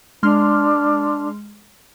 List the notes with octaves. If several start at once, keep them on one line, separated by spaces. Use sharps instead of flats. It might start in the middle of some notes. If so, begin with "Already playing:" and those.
G#3 D4 C6 F6